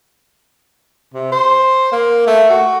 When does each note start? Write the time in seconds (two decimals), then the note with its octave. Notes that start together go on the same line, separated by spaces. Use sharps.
1.14 C3
1.32 C5
1.92 A#3
2.27 A3
2.50 F#4